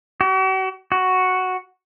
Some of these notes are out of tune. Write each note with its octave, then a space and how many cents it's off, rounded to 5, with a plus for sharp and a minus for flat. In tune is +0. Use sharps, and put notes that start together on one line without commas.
F#4 +45
F#4 +0